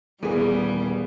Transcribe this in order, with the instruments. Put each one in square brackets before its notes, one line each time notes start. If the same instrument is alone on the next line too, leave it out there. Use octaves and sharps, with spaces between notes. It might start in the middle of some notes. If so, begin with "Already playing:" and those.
[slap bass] D#1 E3 [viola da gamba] G3 [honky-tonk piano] B3 G#4